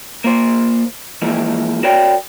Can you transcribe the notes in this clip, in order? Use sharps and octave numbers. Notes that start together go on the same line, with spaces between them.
A#3 F4 C5
E3 F3 G#3 A#3 E4
F#4 A#4 C#5 D5 G5